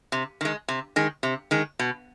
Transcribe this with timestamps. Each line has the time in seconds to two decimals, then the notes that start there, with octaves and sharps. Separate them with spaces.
0.12 C3
0.41 D#3 G#3
0.68 C3
0.96 D#3 G#3
1.23 C3
1.51 D#3 G#3
1.79 B2